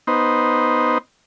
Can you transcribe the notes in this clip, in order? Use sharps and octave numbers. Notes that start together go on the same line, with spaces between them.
B3 D#4 C5